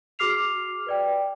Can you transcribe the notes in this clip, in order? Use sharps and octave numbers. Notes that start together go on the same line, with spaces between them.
F#4 G#4 D6 F6 C7 F7
B4 D5 G5